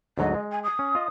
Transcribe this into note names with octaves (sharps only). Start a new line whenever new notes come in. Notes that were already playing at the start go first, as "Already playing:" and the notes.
D2 G#2 F#3 D#5
G#3
G#5
D#6
C#4
F4 D#5